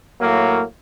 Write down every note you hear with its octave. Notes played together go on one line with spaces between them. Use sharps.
A2 F#3 A#3